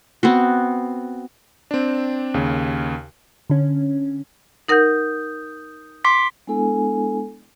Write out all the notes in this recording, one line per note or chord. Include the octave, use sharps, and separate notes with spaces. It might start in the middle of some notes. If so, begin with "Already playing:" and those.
B3 C4 F#4
C4 D4
D#2 C#3
D3 C#4
D#4 A#4 F#5 D#6 G6
C6 D6 B6
G#3 B3 D4 E4 A4 G#5